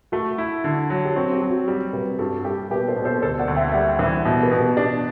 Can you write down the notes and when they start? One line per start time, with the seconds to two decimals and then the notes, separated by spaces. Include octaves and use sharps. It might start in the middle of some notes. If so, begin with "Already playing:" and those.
0.12 A3 F#4 A4
0.38 E4
0.64 D3
0.90 F#3
1.05 G4
1.16 C4 F#4
1.33 G4
1.42 F#3
1.50 F#4
1.67 G3 G4
1.93 C3 G4 B4
2.19 G2 F#4 A4
2.45 G3 G4
2.70 B2 G4 B4
2.88 A4 C5
2.96 B2
3.05 A4 C5
3.22 D2 A4 C5
3.39 D5 F#5
3.48 D2
3.56 E5 G5
3.68 E5
3.73 G3 D5 F#5
3.99 E3 C5 E5
4.25 B2 A4 C5
4.43 G4 B4
4.51 B2
4.60 G4
4.77 D4 G4